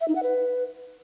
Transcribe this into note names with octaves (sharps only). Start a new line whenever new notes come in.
E5
D#4
F#5
B4